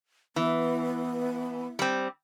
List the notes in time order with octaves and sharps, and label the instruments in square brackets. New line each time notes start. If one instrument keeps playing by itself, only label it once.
[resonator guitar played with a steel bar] E3 [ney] B3
[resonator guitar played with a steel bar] G3 C4